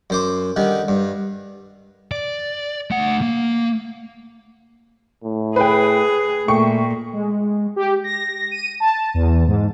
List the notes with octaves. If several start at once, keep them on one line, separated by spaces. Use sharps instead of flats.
F#2 C5 D6
D3 D#3 G3
G2
D5
A3 F#5
A#3
A2
G#4 B4 G5
A#2 A3 G5 C#6
G#3
G4
A#6
D#7
A5
E2
G#2